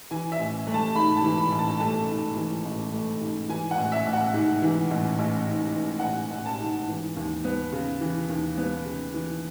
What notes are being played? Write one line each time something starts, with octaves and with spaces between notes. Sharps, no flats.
E3 G#5
E5
A1
A3
A5
G#2 B5
A5
E3
B5
A1
A5
A3 A5
G#2
E3
A1
A3
G#2
E3 G#5
F#5
A1
E5
A1
F#5
G#2
E3
A1
A1
G#2
E3
F#5
A1 G#5
A1
A5
G#2
E3
D#2
B3
C#3
E3
D#2
B3
C#3
E3